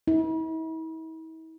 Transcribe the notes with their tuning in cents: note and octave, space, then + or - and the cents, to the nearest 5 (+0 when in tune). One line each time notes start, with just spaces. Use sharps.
E4 -45